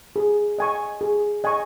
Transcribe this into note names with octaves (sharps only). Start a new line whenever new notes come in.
G#4
D#5 G#5 C#6
G#4
D#5 G#5 C#6